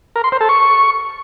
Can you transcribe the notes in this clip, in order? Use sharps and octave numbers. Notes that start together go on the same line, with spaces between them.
A#4
C6
C5
A4
C#6